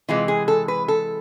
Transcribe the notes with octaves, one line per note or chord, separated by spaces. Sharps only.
C3 E3 G#3 F4
G#4
A4
B4
A4